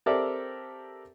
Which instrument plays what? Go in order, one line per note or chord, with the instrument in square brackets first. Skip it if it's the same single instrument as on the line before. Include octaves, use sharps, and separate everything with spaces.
[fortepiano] C4 G4 A4 A#4 D5 E5